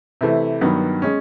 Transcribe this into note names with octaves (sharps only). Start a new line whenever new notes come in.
C3 E3 A3
G2 D#3 F#3 B3
G#3 C#4